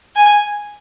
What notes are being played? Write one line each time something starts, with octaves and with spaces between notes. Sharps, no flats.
G#5